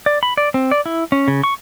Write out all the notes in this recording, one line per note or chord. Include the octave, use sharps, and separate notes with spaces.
D5
B5
D5
C4
D5
E4
C#4
C#3
C#6